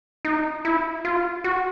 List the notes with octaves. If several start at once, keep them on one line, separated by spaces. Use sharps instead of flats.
D#4
E4
F4
F#4